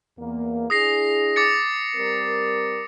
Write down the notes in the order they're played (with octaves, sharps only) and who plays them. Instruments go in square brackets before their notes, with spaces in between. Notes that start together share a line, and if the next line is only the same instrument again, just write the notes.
[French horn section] E2 A#3
[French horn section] D4 E4 G#4 [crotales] D#6 A#6 C7
[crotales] D6 A6 C#7
[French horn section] G3 C4 A#4